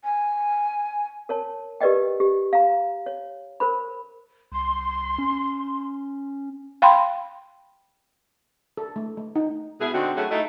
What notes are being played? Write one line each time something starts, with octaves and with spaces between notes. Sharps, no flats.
G#5
A#4 C#5 A5
G4 A#4 B4 D5 D#5 G5
G4
F5 A#5
C#5
A#4 C5 B5
C2 C6
C#4
F5 G5 B5 C6
A4
A3
A3
D#4
B2 E4 G#4
D3 C4 D#4 F#4
F#3 A3 C#4 E4 F#4 G#4
A3 D#4 E4 A4 D#5